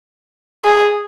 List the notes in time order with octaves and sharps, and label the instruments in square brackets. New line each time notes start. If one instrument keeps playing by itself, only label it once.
[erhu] G#4